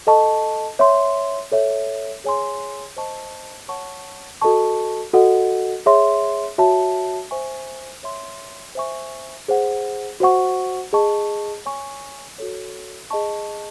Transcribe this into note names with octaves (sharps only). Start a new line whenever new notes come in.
A4 D#5 A5 C#6
C#5 E5 C6
A4 C#5 E5
G#4 C#5 G#5 C6
C5 D#5 A5 C#6
C#5 F#5 A5 C#6
F#4 A4 D#5 A5 C#6
F#4 A4 D#5 F#5
G#4 C#5 E5 C6
F#4 C#5 E5 A5
C5 E5 G#5 C#6
C#5 E5 C6
C5 E5 G#5 C#6
G#4 C5 F#5
F#4 C5 F#5 C#6
G#4 D#5 A5 C#6
C#5 G#5 C#6
F#4 A4 C#5
G#4 D#5 A5 C#6